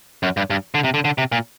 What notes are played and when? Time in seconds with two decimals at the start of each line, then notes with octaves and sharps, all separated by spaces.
0.23 F#2
0.37 G2
0.50 G2
0.75 D3
0.84 C3
0.94 D3
1.05 D3
1.18 C3
1.32 A#2